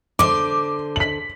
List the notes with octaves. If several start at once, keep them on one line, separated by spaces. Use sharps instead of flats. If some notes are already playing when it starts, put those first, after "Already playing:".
D3 C5 D6
B6 F#7